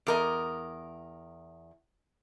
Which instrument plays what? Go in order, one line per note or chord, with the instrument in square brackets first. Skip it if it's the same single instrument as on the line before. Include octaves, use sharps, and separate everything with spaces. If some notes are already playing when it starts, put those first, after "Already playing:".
[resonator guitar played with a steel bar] E2 A#4 D#5